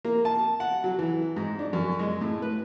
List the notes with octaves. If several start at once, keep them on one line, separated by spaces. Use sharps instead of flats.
A#3
A5
F#5
F#3
E3
G#2
D4
F#2
G#3
A2
B4